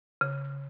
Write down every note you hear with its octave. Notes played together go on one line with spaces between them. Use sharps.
C#3